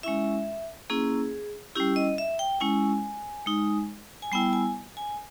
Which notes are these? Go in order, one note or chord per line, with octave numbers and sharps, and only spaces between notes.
G#3 C#4 E4 E5
A#3 C#4 E4 G#4
G3 C#4 E4 G4
D#5
E5
G5
G#3 C#4 E4 G#5
G#3 D#4
G#5
G3 B3 E4 G5
G#5
G#5